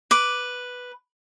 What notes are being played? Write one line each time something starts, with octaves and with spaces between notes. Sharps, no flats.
B4 D6